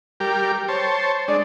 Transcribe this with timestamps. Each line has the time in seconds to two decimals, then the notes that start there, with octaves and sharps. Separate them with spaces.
0.20 G3 G4 A#4
0.68 C5 C#5 A5
1.28 G#3 D4 D5